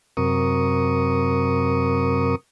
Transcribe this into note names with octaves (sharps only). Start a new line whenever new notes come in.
F#2 C3 A#4 C#6 D#6